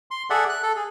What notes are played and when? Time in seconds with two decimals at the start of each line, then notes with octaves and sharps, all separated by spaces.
0.11 C6
0.30 G#4 A4 D5 E5 F#5
0.49 F#6
0.63 A4
0.76 G#4